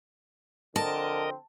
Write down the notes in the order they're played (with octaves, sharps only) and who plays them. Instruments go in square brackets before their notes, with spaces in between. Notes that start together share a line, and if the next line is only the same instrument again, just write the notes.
[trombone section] D3 F3 C4 [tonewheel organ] A#4 D#5 [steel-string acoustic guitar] A5